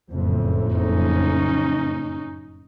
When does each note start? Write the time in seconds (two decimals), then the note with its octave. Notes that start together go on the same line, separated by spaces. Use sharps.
0.11 F#1 F2 A2
0.76 C#4 D#4